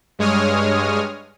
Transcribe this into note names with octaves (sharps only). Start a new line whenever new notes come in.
G2 G#3 C#5 D#6 F6